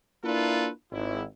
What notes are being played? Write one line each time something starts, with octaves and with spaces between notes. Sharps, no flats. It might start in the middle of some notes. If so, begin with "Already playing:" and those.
A#3 D4 E4 F4 A4 B4
G#1 E4